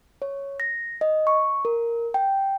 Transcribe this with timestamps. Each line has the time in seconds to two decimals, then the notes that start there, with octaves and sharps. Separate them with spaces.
0.22 C#5
0.60 A#6
1.01 D#5
1.27 C#6
1.65 A#4
2.14 G5